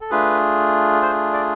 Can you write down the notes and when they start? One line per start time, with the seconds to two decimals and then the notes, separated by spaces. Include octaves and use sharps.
0.01 A4
0.10 A3 D4 F4 G#4 B4
1.02 C5
1.33 D5